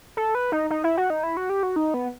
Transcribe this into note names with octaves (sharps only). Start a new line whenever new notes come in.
A4
B4
D#4
D#4
E4
F#4
D#4
E4
F#4
G4
F#4
D#4
B3